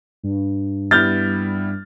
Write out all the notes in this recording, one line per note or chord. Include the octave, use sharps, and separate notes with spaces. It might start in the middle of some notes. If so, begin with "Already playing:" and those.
G2
G3 B3 E4 F6 G6 A6